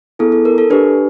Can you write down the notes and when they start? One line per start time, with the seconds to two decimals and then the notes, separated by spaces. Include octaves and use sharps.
0.19 B3 E4 G#4 A4
0.32 A4
0.45 A#4
0.58 A4
0.70 D4 G4 B4